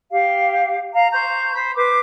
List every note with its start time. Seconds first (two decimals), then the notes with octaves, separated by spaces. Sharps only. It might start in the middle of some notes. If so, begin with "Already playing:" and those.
0.11 G4 F5
0.93 F5 A#5
1.12 C5 A#5 C#6 G6
1.54 C5 B5
1.76 B4 C5 D6